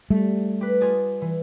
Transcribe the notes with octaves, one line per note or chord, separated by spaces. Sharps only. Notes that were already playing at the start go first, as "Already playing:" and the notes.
G3 A3
G4 B4
F4 G#4 D5
E3